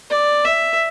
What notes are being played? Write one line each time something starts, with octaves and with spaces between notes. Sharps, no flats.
D5
E5